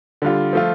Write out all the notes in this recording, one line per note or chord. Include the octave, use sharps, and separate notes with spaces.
D3 G3 F4
F3 A3 F4